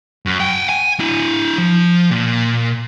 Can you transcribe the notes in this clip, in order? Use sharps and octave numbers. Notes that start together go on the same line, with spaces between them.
F#2
F#5 G5
G#5
D4 E4
F3
A#2